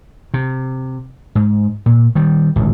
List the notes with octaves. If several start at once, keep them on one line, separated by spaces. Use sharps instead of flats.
C3
G#2
A#2
D#3 G3
D1 G#1 C#2